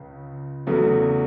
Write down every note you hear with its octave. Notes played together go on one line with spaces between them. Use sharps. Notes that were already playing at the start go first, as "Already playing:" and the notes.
Already playing: C#2 C#3
E2 C#3 F#3 A3